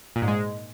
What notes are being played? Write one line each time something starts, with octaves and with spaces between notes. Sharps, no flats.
A#2
G#2
G#3